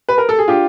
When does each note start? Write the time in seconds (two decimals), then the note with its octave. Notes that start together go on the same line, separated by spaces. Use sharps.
0.09 B4
0.18 A#4
0.29 A4
0.39 G#4
0.48 D4 F4 G4